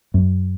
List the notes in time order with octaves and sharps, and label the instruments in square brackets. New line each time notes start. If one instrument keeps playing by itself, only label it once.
[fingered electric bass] F#2